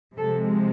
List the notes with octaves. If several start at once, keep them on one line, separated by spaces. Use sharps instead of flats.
C3 F3 G#3 A4